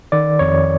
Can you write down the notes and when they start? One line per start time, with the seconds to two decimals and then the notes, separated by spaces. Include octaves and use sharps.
0.12 D#3 D5
0.39 F2 C#5